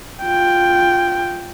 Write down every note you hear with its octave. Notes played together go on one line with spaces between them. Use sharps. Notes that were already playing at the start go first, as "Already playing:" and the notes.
F4 G5